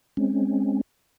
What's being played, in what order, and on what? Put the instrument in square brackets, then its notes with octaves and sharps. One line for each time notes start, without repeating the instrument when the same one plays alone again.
[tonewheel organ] G#3 C4 C#4